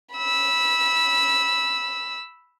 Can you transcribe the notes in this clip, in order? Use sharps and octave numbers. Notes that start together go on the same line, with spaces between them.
B5 E6